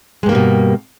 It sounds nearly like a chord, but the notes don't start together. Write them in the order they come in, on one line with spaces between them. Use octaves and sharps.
G#3 G2 A#3 G3 B2